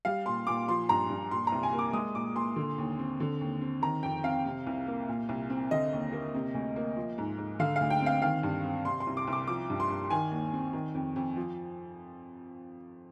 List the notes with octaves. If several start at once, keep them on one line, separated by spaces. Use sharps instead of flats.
G3 F5
A#2 C6
A#2 D6
F3 C6
G2 A#5
G2
A#2 C6
C2 A#5
G#5
A#3
D6
G#3 D#6
A#2 D6
A#2 C6
D3
D#2
C4
D3
D#2
C4
D#3 A#5
F2 G5
C4 F5
C3
C2
A#3
A#2
C2
C4
D3 D#5
D#2
A#3
C3
D2
A#3
F3
G#2
G#2
D3 F5
D2 F5
G5
C4
F5
D#3 F5
G2
C4
C3 C6
C6
C2
D6
C2
D6
F3 D6
G2
C6
G2
D#3 G#5
D#2
C4
D#3
F2
F2
F3